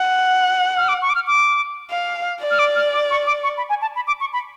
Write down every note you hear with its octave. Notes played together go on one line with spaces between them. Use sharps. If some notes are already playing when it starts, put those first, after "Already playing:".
Already playing: F#5
F6
D6
C#6
D6
F6
D6
F5
D5
F6
D6
F6
D6
C#6
D6
C#6
B5
G#5
A5
B5
D6
C#6
B5